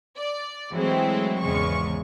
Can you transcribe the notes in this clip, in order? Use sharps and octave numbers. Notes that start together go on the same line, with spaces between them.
D5
E3 F#3 G#3 A3 C4 E4
G#1 E2 C#3 G#3 C#6